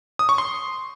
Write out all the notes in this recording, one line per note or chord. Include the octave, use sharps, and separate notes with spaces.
D#6
C#6
C6